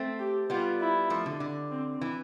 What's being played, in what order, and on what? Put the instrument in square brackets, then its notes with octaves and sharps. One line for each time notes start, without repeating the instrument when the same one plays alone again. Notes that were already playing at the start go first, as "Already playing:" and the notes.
Already playing: [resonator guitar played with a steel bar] A3 C4
[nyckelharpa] G4
[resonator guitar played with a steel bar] G3 B3 [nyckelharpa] F4
[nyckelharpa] E4
[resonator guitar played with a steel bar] F3 A3
D3
D3
[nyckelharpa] C4
[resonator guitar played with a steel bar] E3